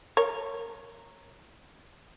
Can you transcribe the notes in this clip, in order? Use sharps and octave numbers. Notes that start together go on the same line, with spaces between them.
A#4 C#5